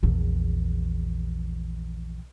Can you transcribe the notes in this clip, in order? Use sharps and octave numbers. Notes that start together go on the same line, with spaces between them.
A#1 E2